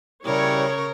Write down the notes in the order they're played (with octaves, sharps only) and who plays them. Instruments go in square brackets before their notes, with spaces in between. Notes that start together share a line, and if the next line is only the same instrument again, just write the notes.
[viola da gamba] C#3 A#4 [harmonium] G3 E4 G4 [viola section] C#5